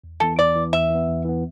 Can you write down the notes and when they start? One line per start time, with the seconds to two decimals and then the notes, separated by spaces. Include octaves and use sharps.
0.04 E2
0.20 E3 B3 A4
0.38 E2 D5
0.56 E3 B3
0.73 E2 E5
0.90 E3 B3
1.08 E2
1.25 E3 B3